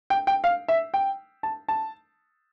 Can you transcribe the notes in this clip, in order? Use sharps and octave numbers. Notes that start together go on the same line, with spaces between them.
G5
G5
F5
E5
G5
A5
A5